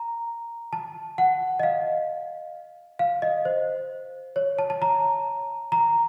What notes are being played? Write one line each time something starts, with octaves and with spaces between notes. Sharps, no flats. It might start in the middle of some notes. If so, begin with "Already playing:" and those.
Already playing: A#5
A5
F#5
D#5
F5
F5
D#5
C5
C#5
A5
A5
A#5
A#5